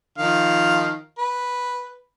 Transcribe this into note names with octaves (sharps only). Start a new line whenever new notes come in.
D#3 F3 F5
B4